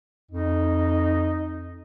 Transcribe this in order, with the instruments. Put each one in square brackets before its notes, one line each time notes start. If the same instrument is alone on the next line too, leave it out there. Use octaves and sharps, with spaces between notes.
[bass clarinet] F2 [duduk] D#4